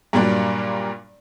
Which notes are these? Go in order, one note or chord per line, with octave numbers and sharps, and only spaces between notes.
G2 A#2 F#3 G3 A#3 D4